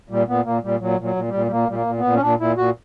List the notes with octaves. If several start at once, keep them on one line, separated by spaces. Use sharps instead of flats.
A#2 G3
A#2 B3
A#2 A#3
A#2 G3
A#2 F#3
A#2 F#3
A#2
G3
A#2
G3
A#2 A#3
A#2 G3
A#3
A#2
B3
A#2
C#4
A#2 D4
A#2 E4
A#2 F#4